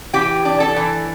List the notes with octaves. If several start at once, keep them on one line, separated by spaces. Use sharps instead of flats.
E3 G4 G5
D4
A4 A5
E3